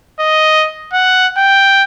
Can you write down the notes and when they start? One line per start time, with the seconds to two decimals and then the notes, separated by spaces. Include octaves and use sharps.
0.20 D#5
0.93 F#5
1.37 G5